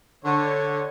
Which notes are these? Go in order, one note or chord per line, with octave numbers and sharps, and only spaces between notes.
D3 C#5